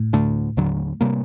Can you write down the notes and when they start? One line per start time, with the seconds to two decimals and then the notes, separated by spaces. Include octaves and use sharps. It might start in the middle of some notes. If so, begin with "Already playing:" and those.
Already playing: A2
0.13 D2 D3 A3 D4
0.57 D#2 D3 F#3
1.01 C3 G3 A#3